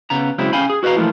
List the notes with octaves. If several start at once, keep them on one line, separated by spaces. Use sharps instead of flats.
C#3 B3 A#5
C#3 F#3 G#3 C4 E4
C#4 F5 G5 G#5 B5
G#4
F#4 B4 D#5 F5 A#5
E3 F3 A3 A#3 F4